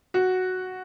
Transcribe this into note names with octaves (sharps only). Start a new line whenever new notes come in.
F#4